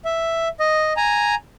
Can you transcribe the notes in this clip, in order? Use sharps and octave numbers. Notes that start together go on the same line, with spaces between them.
E5
D#5
G#5 A#5